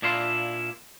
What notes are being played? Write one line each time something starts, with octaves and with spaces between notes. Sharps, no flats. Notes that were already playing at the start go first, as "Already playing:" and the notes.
A#2 D4 E4 F5 C6